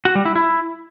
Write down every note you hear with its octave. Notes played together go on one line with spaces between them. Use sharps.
F#4
G3
E4
E4